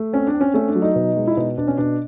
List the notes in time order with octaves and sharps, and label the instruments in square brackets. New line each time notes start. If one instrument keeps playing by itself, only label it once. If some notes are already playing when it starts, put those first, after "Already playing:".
Already playing: [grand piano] A3
C4 C#4
D4
C4
C#4
A3 C#4
D4
F#3
D#4
B2
G#3
E4
B2 D#4
B2 D4
C#4
B2 D4